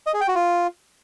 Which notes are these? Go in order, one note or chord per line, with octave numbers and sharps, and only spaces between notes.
D#5
G#4
G5
F#4
F4